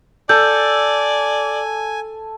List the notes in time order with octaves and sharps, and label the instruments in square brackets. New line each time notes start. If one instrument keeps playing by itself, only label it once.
[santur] A4 [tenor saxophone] D5 [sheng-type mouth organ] G#5 [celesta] G6